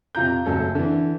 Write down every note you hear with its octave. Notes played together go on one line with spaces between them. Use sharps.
F2 C3 F4 A#5 G6
F#1 F#3 C#4 A4
D3 E3